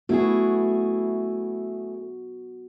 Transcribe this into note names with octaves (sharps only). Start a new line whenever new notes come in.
A3 B3 E4 F#4 G#4